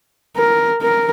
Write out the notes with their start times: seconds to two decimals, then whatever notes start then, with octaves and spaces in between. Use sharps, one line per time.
0.37 A#4
0.82 A#4